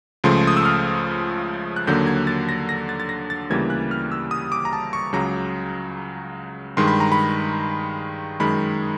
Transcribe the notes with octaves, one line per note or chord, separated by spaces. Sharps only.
C#2 C#3 F3 A3 C6
D#6
E6
F6
F#6
D#2 D3 F#3 A#3 G6
G#6
A6
A#6
A#6
A6
A6
A#6
A6
D2 C#3 E3 G3 A#3 G#6
F#6
F6
E6
D#6
D6
A#5
A5
C#6
C#2 C#3 F#3 A#5
G2 D#3 G#3 C6
B5
A#5
B5
F#2 D#3 G#3 B5